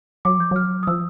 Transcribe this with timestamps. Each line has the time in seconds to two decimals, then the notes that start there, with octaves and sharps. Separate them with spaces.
0.25 F#3 D6
0.39 F3 G6
0.51 F#3 F6
0.83 D#6
0.87 F3 E6